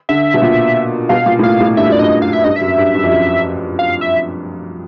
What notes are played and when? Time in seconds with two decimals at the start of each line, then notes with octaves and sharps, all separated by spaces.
0.09 D3 E5
0.34 B2
0.42 A#2
1.09 B2 F5
1.26 A#2
1.39 A2
1.43 A#2 F5
1.60 A2
1.77 G2 E5
1.89 F#2 D5
1.99 G2 D#5
2.22 F5
2.33 E5
2.44 G2 D#5
2.56 E5
2.61 F#2
2.78 G2
2.95 G2
3.03 F2
3.12 F#2
3.79 F5
4.01 E5